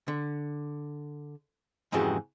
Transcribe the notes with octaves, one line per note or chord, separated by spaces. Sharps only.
D3
F2 G#2 C#3 E3 F#4 G4